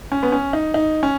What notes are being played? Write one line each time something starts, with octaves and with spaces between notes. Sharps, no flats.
C#4
B3
C#4
D#4
D#4
C#4